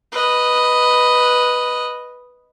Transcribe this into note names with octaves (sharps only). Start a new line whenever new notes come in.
B4 D#5